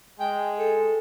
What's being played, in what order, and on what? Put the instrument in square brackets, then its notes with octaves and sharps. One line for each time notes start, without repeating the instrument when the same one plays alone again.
[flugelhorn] G#3 [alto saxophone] G5
[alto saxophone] A4